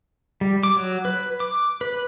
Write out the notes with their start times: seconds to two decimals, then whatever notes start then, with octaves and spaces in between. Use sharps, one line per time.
0.41 G3
0.63 D6
0.76 F#3
1.05 B4
1.40 D6
1.81 B4